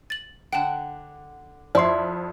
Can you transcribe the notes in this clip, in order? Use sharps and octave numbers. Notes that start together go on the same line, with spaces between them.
A6 F#7
D3 F#5 G5 A5
F2 E4 C5 D5 C6 C7